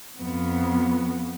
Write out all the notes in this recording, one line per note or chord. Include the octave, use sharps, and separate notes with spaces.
F2 B3